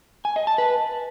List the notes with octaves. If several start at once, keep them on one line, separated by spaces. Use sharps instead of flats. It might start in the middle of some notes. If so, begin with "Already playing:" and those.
G#5
D#5
A5
B4